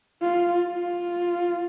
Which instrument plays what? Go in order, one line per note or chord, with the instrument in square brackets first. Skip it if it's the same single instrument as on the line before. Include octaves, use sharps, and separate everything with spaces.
[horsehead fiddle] F4
F4